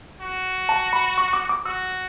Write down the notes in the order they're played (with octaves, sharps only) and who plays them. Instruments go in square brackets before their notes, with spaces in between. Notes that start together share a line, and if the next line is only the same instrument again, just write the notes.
[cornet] F#4
[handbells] A5
B5
C#6
D6
D6
[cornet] F#4 [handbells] E6